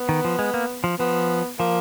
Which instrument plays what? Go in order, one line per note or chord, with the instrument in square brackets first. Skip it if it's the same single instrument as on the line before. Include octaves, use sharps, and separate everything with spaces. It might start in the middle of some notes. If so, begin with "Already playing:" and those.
Already playing: [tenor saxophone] B3
[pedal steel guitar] D#3
F3
G#3
A#3
F3
[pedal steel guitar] F3 [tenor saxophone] B3
[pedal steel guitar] F3 [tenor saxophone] A#3